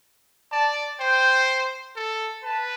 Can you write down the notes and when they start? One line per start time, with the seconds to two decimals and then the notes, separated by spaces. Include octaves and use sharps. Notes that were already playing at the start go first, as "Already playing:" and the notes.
0.52 D5 A5
1.00 C5 G5
1.96 A4
2.44 B4 A5